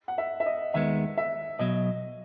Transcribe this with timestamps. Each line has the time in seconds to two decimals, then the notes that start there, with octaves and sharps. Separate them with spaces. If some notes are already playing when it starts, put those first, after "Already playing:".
0.08 F#5
0.18 E5
0.40 E5
0.46 D#5
0.74 D#2 D#3 G#3 B3 E5
1.17 E5
1.59 B1 B2 F#3 D#5